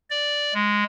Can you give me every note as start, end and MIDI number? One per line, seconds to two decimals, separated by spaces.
0.10 0.54 74
0.54 0.84 56